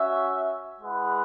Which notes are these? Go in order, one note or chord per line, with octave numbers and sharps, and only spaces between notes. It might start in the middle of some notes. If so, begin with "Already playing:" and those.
Already playing: C#4 F#4 E5
G#3 E4 G#4 B4 F#5